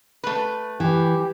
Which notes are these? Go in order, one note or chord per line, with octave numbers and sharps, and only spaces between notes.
A3 B4
E3 G4